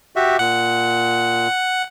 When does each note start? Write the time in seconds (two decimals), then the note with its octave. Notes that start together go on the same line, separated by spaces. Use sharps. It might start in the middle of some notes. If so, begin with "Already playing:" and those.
0.16 F#4 G4 E5
0.39 A#2 F#5